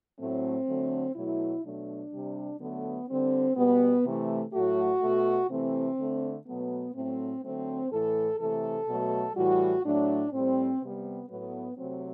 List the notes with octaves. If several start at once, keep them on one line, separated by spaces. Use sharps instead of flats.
A2 F#3 A3 C4
D3 F#3 A3
B2 F#3 A3 E4
B2 F#3 A3 D4
C3 G3
D3 F#3 A3 B3
D3 G3 C4
B2 G3 B3
C3 E3 A3
A2 F#3 A3 F#4
B2 A3
C3 E3 A3 C4
D3 A3
B2 F#3 A3 B3
A2 F#3 A3 C4
D3 F#3 A3 C4
A2 E3 A3 A4
C3 E3 A3 A4
B2 F#3 A3
A2 E3 G3 F#4
A2 F#3 A3 D4
A2 G3 C4
C3 G3 B3
A2 F#3 A3 B3
C3 F#3 A3 C4